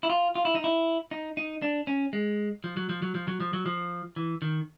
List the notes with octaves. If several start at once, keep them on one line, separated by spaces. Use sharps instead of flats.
E4
F4
F4
E4
D#4
E4
D#4
D#4
D4
C#4
G#3
F3
F#3
F3
F#3
F3
F#3
F3
F#3
F3
E3
D#3